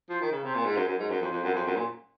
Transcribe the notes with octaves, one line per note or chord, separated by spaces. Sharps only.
F3
D#3
C#3
C3
A#2
G#2
F#2
F#2
G#2
F#2
F2
F2
F#2
F2
F#2
A#2